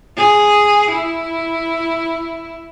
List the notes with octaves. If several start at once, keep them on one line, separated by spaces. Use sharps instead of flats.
G#4
E4